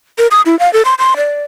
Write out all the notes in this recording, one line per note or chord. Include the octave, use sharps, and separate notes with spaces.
A#4
D#6
E4
F5
A4
C6
C6
D5